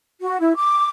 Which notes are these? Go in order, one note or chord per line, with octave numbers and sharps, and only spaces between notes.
F#4
E4
D6